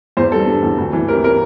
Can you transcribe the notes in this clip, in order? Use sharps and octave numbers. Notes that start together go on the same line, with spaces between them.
E2 C5
G3 A4
D3
E2
D2
E3
C3 A#4
A#4